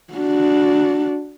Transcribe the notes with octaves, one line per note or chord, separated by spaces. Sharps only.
D4 F#4